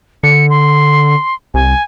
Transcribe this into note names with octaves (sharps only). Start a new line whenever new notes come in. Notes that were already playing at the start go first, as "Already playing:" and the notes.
D3 C#7
C6
C2 G#5